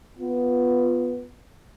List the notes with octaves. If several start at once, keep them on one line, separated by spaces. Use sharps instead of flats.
B3 F4